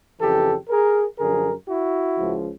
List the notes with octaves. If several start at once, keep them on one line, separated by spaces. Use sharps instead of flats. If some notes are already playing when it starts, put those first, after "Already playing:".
F2 C#3 E3 G4 A4
G#4 A#4
F#2 D3 F3 G#4 A#4
E4 F#4
C#2 C#3 F3